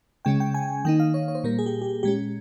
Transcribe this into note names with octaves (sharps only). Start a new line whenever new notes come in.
C#3 G#3 C#4 G5
G5
G#5
D#3 A#3 D#4 G5
F5
C#5
C#5
C5
A#2 G3 A#3 A#4
G#4
G4
G4
A#2 G#3 C#4 G4